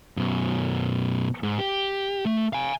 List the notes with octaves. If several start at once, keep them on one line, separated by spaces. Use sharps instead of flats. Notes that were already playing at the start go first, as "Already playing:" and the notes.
F#2 B2
G#2
G4
A3
F5 G#5